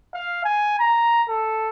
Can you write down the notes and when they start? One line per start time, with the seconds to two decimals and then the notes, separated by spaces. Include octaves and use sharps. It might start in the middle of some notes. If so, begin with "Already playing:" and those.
0.14 F5
0.44 G#5
0.79 A#5
1.29 A4